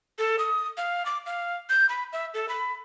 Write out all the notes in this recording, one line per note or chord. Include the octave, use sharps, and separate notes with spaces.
A4
D#6
F5
D6
F5
G6
B5
E5
A4
B5